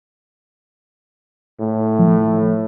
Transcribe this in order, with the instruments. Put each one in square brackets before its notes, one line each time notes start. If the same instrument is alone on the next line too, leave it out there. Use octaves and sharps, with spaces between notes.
[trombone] A2
[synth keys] F3